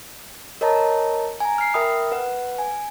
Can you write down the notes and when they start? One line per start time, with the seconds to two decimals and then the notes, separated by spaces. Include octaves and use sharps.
0.61 A#4 C#5 D#5 A5 A#5
1.40 G#5 A#5
1.58 F6 C7
1.74 A#4 E5 G5 B5 D#6 F6
2.12 B4 F#5
2.58 G#5